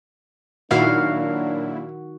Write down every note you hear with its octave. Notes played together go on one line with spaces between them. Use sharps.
A#2 D#3 F#3 A#3 D4 E4 F#4 F5